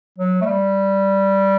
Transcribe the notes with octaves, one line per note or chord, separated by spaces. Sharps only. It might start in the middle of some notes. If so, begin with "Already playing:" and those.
F#3
A3
G3